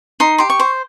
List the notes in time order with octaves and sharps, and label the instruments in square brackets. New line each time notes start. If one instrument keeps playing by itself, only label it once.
[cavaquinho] D#4 C6
G4 C6
C#6
C5